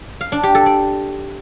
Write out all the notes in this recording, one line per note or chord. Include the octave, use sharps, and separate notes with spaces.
F5
D4
G4
A4
D5